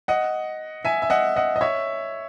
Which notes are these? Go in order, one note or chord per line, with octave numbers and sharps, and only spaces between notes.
D#5 F#5
E5 G#5
E5
D#5 F#5
D#5 F#5
D#5
C#5 E5